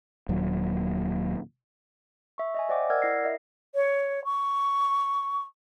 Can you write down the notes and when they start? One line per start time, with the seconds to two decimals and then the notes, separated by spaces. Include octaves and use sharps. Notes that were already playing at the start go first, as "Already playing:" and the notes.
0.29 D#1 D#2 A#2 F#3
2.38 E5 C#6
2.55 D#5 E5 G#5
2.69 C5 D5 D#5 F#5 G5 D6
2.90 A#4 D5 F#5 E6 F6 G#6
3.02 E4 A#6 C7
3.22 A#4 D#5 E5
3.75 C#5
4.25 C#6